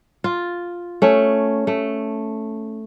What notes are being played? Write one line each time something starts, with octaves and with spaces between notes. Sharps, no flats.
F4
A3 C#4
A3